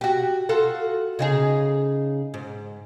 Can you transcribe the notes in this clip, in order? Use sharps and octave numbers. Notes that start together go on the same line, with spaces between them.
F#4 G4
F4 F#4 A4
C#3 D#4 G#4
G#2